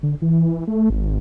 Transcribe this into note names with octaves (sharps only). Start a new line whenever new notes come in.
D3
E3
A3
G#1